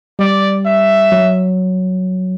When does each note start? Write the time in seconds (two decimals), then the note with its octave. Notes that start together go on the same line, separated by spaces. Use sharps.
0.19 G3 D5
0.66 E5
1.12 F#3